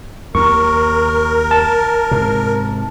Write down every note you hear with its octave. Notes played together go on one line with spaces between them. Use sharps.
D#2 A#4 C#6
A5
G#2 C3